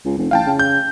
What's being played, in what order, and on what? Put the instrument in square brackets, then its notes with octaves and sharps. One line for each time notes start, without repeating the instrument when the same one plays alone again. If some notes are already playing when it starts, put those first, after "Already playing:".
[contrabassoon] C#2
F1
[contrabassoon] A1 [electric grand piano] F5 G5 A5
[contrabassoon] C#3
[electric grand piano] G6